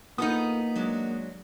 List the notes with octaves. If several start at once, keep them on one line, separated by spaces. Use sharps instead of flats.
A#3 B3 D#4 F4 A4 D#6
F#3 G#3 D4